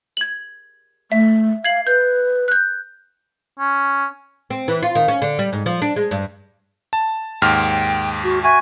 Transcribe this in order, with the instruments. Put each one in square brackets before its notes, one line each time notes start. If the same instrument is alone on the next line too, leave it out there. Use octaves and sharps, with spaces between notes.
[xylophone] G#6 F#7
[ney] A3 [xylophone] E5
[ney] F5 [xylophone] G#6 C7 F#7
[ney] B4 [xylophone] G6
[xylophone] F#6 G6
[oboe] C#4
[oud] C4
E3
F4
D#3
C#4
D3
G3
G#2
F3
D4
G#3
G2
[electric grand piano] A5
[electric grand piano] D#2 G#2 F6 [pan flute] G5
[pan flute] F#4
[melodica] F#4 G#5 [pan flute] E5